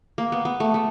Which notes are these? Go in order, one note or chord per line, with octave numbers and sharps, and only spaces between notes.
A#3
B3
B3
A3
A3